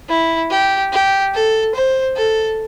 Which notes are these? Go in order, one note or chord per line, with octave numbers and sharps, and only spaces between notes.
E4
G4
G4
A4
C5
A4